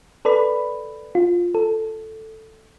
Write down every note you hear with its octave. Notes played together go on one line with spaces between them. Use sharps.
A4 B4 D5 B5
F4
A4